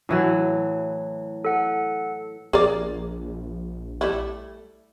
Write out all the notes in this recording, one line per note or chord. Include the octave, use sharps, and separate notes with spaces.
A2 E3 F#3
A4 F#5
A#1 G#4 A#4 D5
G3 A3 E4